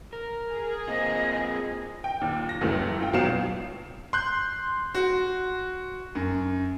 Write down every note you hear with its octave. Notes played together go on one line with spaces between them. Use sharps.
A#4
G#4
A#3 C4 F4 D#5
G5
D#2 A#2
A#6
C#2 F#2 E3 A3
F4 G5
G#1 B2 F#3 F5 C7 E7
C6 F#6 G6
F#4
F#2